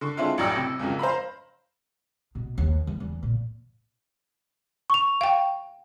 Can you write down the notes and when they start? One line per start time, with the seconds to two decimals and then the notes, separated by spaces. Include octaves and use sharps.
0.01 D3 C#6
0.17 G#3 C4 D4 E4 F4
0.38 A1 A2 F#3 D5 G5 E6
0.56 C3
0.79 G#1 F2 C#3 F#3
0.99 C5 F5 A#5 B5
2.35 B2
2.58 D#2
2.87 E2
3.00 E2
3.23 A#2
4.90 C#6 F7
5.21 F5 G5